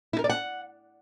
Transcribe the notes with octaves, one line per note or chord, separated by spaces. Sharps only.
E4
A#4
D5
F#5